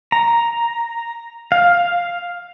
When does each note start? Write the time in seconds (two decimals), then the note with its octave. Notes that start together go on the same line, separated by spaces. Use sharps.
0.12 A#5
1.52 F5